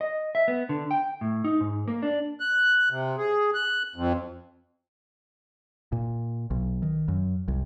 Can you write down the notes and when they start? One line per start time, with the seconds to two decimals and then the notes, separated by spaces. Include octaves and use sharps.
0.01 D#5
0.35 E5
0.48 B3
0.69 D3
0.91 G5
1.21 A2
1.44 D#4
1.61 G#2
1.88 A#3
2.02 D4
2.40 F#6
2.90 C3
3.18 G#4
3.55 F#6
3.95 F2
5.92 A#2
6.51 B1
6.83 D#3
7.08 F#2
7.48 C2